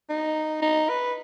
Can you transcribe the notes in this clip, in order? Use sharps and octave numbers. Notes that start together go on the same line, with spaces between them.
D#4
D#4
B4